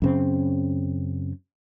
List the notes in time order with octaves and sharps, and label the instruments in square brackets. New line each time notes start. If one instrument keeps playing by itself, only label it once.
[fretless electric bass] F#2 C#3 C4